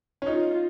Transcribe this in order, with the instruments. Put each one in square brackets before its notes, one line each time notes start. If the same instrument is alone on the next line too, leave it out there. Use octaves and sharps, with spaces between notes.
[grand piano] C#4
[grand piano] D#4 [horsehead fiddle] F4